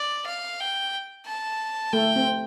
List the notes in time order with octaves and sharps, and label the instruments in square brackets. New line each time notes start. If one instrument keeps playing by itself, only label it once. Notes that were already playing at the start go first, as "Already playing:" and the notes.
Already playing: [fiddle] D5
F5
G5
A5
[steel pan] A3 [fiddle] G5
[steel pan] C4